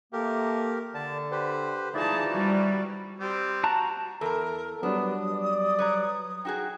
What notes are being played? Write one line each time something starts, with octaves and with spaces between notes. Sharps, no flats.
A3 A#3 G4 A#4
D3 D5 A5
G4 B4 C5
E3 F3 D#4 G#4 D5 A5
G3 F#4
G3 C4
F#4 A5 A#5
E2 A4 A#4 A#5
F#3 G3 B3 D4 D#6
D5
B4 C#5 A#5
D#4 F#4 G#4 G5